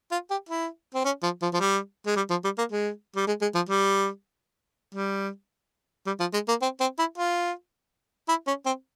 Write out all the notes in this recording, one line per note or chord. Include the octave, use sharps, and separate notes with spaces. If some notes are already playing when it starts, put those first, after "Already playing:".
F4
G4
E4
C4
C#4
F3
F3
F3
G3
G#3
G3
F3
G3
A#3
G#3
G3
G#3
G#3
F3
G3
G3
G3
F3
G#3
A#3
C4
C4
E4
F4
E4
C#4
C4